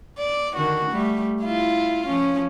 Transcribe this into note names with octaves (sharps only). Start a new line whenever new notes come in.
D5
D3 D#3 F#4
G3 A3
E4 F4
F3 C#4